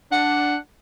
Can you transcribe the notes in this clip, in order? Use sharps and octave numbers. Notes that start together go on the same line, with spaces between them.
D4 F#5